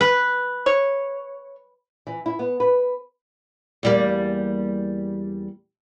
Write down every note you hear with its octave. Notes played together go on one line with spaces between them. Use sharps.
B4
C#5
E3
E4
B3
B4
E2 G3 A#3